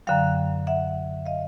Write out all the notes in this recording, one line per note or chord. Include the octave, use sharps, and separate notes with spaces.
F#2 D3 F#3 F5 G5
E5 F#5
D#5 F5